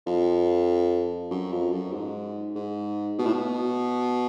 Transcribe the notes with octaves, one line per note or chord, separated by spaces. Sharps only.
F2
F#2
F2
F#2
G#2
G#2
B2
A2
B2